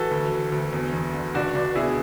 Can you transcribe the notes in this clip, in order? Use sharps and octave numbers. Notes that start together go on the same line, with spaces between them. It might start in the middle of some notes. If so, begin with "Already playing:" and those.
Already playing: E3 F#4 A4
D2
E3
D2
E2
E2
D3
C#2 D4 F#4
C#2 D4
B2 E4 G#4